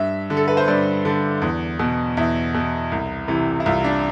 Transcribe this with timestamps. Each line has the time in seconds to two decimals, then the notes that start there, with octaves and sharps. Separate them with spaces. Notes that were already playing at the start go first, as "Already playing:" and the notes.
Already playing: G2 E5
0.30 D3
0.37 A4
0.48 B4
0.57 C5
0.68 G2 D5
1.05 D3
1.42 E2
1.79 B2
2.17 E2 E5
2.54 B2
2.92 C2
3.28 C3 E3
3.60 E4
3.66 C2 F4
3.84 D4